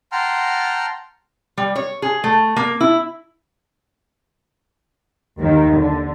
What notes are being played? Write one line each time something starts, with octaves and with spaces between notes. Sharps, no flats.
F#5 G5 A5 A#5 C6 F6
G3
C#5
G#4
A3
A#3
E4
D#2 D#3
D3